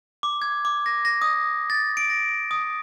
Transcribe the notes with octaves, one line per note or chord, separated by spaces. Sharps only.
D6
G#6
D6
A#6
A#6
D#6
A6
D7
A#6
D#6